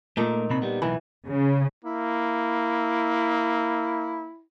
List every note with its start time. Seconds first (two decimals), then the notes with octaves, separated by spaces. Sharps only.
0.17 A#2 A3 A#3 D#4
0.50 C3 C4 B5
0.62 G3 B3
0.82 B1 E3 B3 B5
1.28 C#3
1.85 A#3 E4